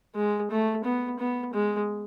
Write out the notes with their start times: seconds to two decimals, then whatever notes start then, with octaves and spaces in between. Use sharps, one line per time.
0.16 G#3
0.51 A3
0.84 B3
1.19 B3
1.54 G#3